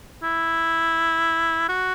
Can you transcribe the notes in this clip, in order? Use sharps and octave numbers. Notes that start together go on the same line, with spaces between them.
E4
F#4